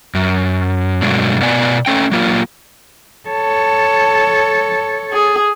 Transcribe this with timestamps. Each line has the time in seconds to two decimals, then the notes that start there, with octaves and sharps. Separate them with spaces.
0.15 F#2
1.02 G2 B2 F#3 G#3 D4
1.41 B2 B3 D5 G#5
1.86 A3 C#4 G5
2.11 F#3 A#3 F4
3.29 A4 C#5 A5
5.13 G#4